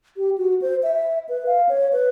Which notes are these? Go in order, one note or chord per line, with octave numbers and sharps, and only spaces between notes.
G4
F#4
C5
E5
B4
F5
C#5
B4